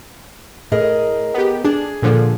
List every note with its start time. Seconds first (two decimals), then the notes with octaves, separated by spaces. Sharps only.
0.72 A2 G#4 A#4 D#5
1.34 B3 G4
1.64 D4 G#4
2.02 A#2 D3 F3